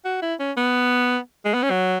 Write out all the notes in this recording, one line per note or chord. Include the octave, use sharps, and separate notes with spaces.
F#4
E4
C#4
B3
G#3
B3
C#4
F#3